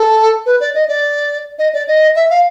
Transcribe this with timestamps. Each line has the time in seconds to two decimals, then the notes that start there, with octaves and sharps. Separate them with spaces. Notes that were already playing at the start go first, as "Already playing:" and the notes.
Already playing: A4
0.46 B4
0.60 D5
0.75 D#5
0.88 D5
1.59 D#5
1.74 D5
1.88 D#5
2.16 E5
2.30 F5